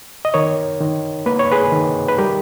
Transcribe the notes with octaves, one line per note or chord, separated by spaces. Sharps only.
D#5
D#3 A#4 C#5
D#3
A#3 B4
C#5
G#4 B4
D#3
B4
G3 G4 A#4